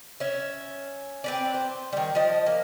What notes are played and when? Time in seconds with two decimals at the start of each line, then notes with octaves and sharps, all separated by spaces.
0.20 C#4 E5
1.24 C4 B4 D5
1.54 C5
1.93 D#3 G3
2.15 F3 D#5
2.47 A#3